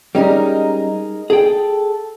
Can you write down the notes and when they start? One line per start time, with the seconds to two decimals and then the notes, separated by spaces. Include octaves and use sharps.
0.15 G3 G#3 C#4 D#4 A#4
1.30 G#4 A4 G5